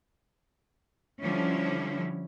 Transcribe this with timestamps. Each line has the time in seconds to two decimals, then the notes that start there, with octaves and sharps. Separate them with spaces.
1.20 D3 F3 G3 C#4 E4